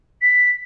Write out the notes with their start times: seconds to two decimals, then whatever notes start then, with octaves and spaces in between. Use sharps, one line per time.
0.22 B6